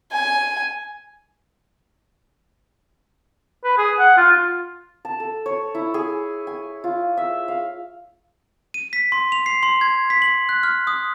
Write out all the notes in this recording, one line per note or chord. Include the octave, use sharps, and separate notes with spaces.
G#5
B4
G#4
F#5
F4
F4
A5
A4
C#5
E4
G#4
G#5
F4
E5
F5
D#7
B6
C6
F7
C7
C6
G#6
B6
F#7
F#6
F6
D#6